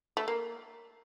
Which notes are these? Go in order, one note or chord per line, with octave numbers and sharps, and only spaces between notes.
A3
A#3